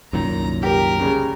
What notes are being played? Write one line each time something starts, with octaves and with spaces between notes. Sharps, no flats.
C2 F#2 A#2 D#3 A#5
G4 A#4
C#3 G3 G#3